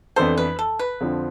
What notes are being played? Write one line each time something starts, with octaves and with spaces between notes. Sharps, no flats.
F2 E3 B3 D4 A4 C5
B4
A4
B4
F2 D3 F3 C4